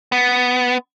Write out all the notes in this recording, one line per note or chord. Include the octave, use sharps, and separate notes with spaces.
B3